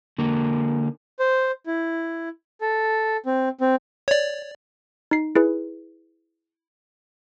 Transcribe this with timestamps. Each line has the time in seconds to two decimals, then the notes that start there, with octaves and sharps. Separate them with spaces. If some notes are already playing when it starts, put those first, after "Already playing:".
0.18 D3 A#3
1.19 C5
1.67 E4
2.61 A4
3.26 C4
3.61 C4
4.08 C#5 D5
5.11 D#4 C7
5.35 E4 G#4 B4